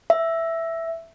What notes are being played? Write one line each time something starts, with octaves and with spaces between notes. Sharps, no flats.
E5